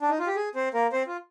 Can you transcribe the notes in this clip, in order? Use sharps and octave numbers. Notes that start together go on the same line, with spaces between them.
D4
D#4
F4
G4
G#4
C4 C5
A#3 A#4
C4 C5
F4